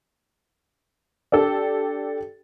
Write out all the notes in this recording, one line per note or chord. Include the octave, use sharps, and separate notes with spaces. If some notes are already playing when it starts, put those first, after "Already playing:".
D4 G4 A4